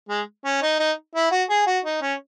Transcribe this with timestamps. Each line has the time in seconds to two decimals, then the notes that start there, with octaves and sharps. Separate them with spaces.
0.09 G#3
0.45 C#4
0.62 D#4
0.79 D#4
1.15 E4
1.31 F#4
1.49 G#4
1.67 F#4
1.85 D#4
2.01 C#4